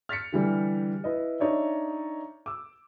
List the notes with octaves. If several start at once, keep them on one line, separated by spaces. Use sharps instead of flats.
F6 A6 B6 C#7
D3 E3 G3
E4 B4 D#5
D4 D#4 C#5 D5 E5
D6 E6